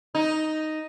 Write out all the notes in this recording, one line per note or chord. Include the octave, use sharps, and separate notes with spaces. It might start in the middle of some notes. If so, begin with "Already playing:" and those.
D#4